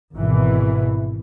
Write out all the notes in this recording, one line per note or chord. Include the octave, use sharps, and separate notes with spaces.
G#1 B2 E3